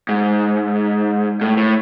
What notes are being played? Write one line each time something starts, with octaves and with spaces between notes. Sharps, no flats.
G#2
A2
A2